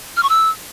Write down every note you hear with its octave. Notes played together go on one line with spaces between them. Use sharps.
F6
C#6
E6